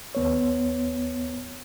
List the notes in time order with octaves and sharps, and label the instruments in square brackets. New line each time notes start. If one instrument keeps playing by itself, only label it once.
[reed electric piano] D#2 B3 C#5